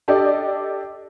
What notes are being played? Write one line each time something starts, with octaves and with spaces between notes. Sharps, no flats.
D4 G4 A4 D5 D#5